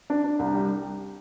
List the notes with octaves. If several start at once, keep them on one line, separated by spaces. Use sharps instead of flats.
D4
D4
C2
G3